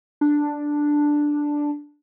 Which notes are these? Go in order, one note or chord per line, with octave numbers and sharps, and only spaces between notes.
D4